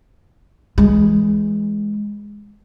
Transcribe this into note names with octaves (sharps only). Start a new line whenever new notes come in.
E3 G#3